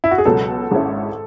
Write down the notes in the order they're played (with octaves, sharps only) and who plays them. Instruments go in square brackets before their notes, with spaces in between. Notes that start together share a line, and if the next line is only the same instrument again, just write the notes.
[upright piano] E4
F#4
G#4
[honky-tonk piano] C#2 B2 F#3 [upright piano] A4
[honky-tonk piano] G#1 G#2 G#3 C#4 E4